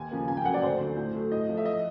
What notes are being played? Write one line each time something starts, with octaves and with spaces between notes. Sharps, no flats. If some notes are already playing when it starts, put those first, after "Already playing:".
Already playing: D#2 G#5
C#3 F3 A#3
C#2 G#5
G5
C#3 F#3 A#3 F#5
D5
D2 C5
D3 F#3
A2
F#3 A3
A2 D#5
F3 A3
E5
D#5